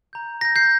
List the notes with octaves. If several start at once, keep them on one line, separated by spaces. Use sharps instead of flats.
A#5 G6
A#5 G6 A#6
G6 C7